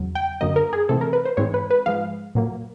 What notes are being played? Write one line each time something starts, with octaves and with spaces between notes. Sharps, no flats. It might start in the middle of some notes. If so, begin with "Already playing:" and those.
Already playing: E2 C#3 F#3
G5
F#2 D3 F#3 A#3 D#5
A#4
G#4
C3 E3 A3 C4 A4
A#4
B4
C5
G#2 E3 G#3 C4 C#5
B4
B4
G#2 F3 G#3 F5
A#2 F#3 A#3